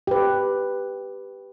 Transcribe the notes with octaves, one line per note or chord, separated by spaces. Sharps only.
G4 B4